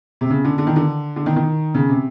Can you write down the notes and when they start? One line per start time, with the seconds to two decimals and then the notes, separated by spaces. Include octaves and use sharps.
0.21 C3
0.30 C#3
0.45 D3
0.58 D3
0.67 D#3
0.76 D3
1.16 D3
1.26 D#3
1.36 D#3
1.74 C#3
1.89 C3